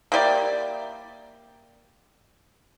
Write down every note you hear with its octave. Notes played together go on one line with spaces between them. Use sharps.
A#3 E4 G4 D5